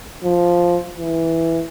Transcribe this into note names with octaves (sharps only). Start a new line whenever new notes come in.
F3
E3